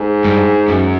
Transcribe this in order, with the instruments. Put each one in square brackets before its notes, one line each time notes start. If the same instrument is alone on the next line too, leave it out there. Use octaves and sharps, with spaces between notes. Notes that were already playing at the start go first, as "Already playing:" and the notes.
Already playing: [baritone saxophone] G#2
[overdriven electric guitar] G2
F#2